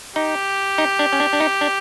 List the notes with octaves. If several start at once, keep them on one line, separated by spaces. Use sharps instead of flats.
D#4 G4
D#4
D4
C#4
D4
D4
D#4
D4